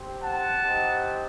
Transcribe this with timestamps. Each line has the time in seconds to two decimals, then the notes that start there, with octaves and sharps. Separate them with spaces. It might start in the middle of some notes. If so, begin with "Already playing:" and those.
Already playing: C4 G4
0.20 F#5 A5
0.61 C4 D#4 G4